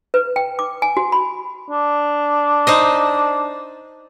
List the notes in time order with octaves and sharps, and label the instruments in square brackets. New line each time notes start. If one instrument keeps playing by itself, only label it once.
[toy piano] B4
G5
D6
G#5
F#4
B5
[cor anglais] D4
[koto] D#4 C5 D#5